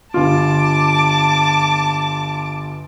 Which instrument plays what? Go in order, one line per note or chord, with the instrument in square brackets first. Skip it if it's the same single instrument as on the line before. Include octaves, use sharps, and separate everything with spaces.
[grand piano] G1 F4 [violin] A5 D6